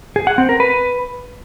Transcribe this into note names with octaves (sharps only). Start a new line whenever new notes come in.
G#4
F#5
C4
A#4
B4